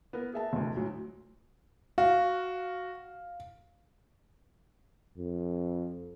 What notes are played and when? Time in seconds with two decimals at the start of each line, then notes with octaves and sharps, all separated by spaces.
0.13 B3 A#4
0.34 G#4 E5 A5
0.53 F1 D2
0.77 D2 A2 F#3
1.98 F#4 F5
5.18 F2